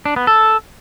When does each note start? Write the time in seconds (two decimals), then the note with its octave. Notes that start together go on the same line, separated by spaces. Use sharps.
0.06 D4
0.16 B3
0.27 A4